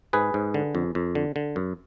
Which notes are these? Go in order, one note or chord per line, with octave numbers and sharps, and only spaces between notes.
G#2 G#4 B4
G#2
D3
F2
F2
D3
D3
F#2